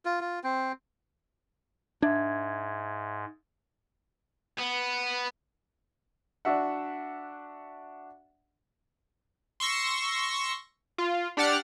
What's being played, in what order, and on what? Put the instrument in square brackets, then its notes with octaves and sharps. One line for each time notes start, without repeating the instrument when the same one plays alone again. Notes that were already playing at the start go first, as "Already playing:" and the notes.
[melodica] F4
F4
C4
[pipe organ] G#2 [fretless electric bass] D4 [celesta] E5 G#6
[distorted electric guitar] B3
[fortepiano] D4 F#4 E5 F#5
[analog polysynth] C6 C#6 E6 A#6
F4
D4 G4 D5 F#5 F6